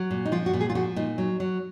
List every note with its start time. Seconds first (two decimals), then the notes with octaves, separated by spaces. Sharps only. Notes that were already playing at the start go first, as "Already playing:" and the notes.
Already playing: F#3
0.11 A#2
0.25 D#4
0.32 F3 F4
0.46 F#4
0.53 A#2
0.60 G#4
0.70 F4
0.75 F3 F#4
0.96 A#2 D#4
1.18 F#3
1.40 F#3